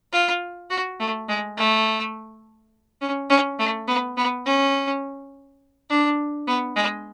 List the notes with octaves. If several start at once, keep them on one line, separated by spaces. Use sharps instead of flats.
F4
F#4
A3
G#3
A3
C#4
C#4
A3
B3
B3
C#4
D4
B3
G#3